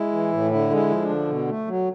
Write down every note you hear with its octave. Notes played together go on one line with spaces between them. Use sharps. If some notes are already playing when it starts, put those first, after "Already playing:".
Already playing: G#3 E4
E3
A2
D3 E4
G#3
E4
F3
D4
D3
B2
A3
F#3